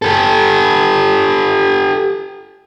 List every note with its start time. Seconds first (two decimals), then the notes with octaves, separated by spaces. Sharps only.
0.02 G4 A4